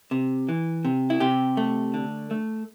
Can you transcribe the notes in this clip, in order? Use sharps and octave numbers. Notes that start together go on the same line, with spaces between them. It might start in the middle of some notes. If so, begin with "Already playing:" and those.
C3
E3
C3
E4
C3 G4
A3
D3
A3